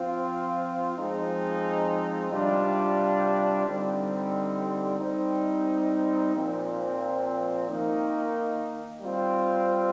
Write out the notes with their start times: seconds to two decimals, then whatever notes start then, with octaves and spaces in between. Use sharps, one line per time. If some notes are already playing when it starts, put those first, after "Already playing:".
Already playing: F3 C4 F4
0.97 F3 G#3 C4 D#4
2.32 C3 G3 D4 F4
3.65 D3 G3 C4 D#4
4.99 G3 C4 D#4
6.34 A#2 F3 C4
7.68 D#3 A#3 D#4
9.01 G3 C4 F4